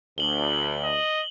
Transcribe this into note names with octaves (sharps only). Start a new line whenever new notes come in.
D2 F#7 G7
D#5